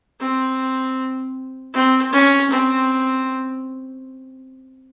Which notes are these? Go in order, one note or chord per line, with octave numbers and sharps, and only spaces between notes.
C4
C4
C#4
C4